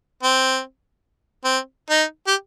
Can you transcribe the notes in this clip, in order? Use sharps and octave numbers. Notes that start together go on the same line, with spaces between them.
C4
C4
D#4
G4